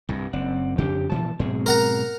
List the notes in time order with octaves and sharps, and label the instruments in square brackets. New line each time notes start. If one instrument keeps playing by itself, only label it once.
[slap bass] C2 G2
[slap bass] F#1 [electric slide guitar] C4 D5 F#5
[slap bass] F2 C#3 D4 [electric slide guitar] G4
[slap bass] A#2 E3 F3 [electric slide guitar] A5
[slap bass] G#2 B2 F#3 [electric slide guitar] C4 G#4
[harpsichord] A#4 F#5 A#5